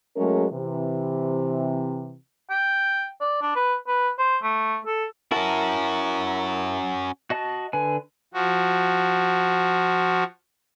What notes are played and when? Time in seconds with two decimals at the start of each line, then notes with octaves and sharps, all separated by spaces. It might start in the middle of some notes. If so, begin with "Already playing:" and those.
0.17 F#3 G#3 A3 C#4 G#4 A#4
0.52 C3 E3
2.50 G5
3.21 D5
3.41 D4
3.55 B4
3.87 B4
4.18 C5
4.43 A3
4.86 A4
5.32 C#4 E4 F#4 A#4 A5
7.30 F#4 D#5 A5
7.73 D3 B4 G#5
8.34 F3 F#4